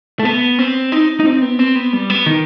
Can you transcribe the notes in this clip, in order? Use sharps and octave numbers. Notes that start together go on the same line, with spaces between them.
A3
B3
C4
D#4
D#4
C4
B3
C4
B3
G3
B3
D#3